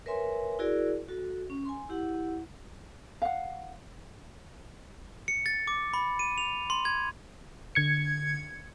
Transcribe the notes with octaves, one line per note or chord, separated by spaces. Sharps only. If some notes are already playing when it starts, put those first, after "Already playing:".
A#4 B4 C#5 E5 G#5 C6
E4 F#4 G#4 A#4 D5
F#4 A4
C#4
G#5 C6
E4 G4 F#5
F5 F#5
C#7
A6
D6
B5
D#7
F7
C6
G#6
D3 G#6 C#7